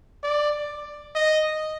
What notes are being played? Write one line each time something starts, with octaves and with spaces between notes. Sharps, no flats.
D5
D#5